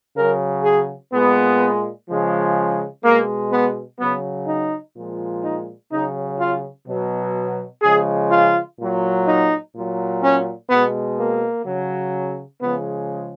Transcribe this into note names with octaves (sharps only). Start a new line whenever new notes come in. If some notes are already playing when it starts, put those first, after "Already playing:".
C#3 F#3 A#4
G#4
A#2 G#3 B3
C#3 F3 G#3
B2 G#3 A#3
B3
C#3 F#3 B3
D#4
A#2 F3 G#3
D#4
C#3 F#3 D#4
F4
B2 F#3
C#3 F3 G#3 G#4
F4
A#2 F#3
D#4
A#2 F#3
C#4
B2 G#3 B3
A#3
C#3 F#3
C#3 F3 G#3 B3